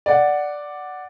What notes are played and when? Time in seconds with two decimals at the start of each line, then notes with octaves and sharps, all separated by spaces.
0.06 D5 F#5